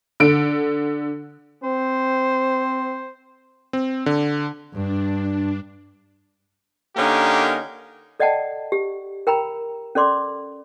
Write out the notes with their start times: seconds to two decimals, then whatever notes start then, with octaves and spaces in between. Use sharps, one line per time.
0.20 D3 D7
1.63 C4 C5
3.73 C4
4.06 D3
4.73 G2 D4
6.96 D3 A#3 C#4 D#4 G4 A#4
8.20 A4 D5 D#5 F#5 G5 A5
8.72 G4
9.27 A#4 G5 A#5 B5
9.95 C#4 A4 D5 C6 D6